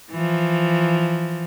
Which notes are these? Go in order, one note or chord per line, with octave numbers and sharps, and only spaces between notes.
E3 F3